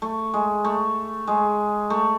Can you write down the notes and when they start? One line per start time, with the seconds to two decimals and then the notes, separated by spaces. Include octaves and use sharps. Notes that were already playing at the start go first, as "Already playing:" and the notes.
0.02 A3
0.34 G#3
0.64 A3
1.27 G#3
1.90 A3